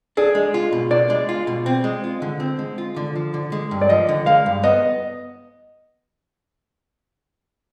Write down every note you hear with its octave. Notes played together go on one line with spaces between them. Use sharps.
D4 G#4
G#3
F4
B2
D4 D5
G#3
F4
B2
C4
G#3
F4
D3
C4
G#3
F4
D3
F3
D3
G#3
G2
D5
F3 D#5
D3
G#3 F5
G2
B3 D#5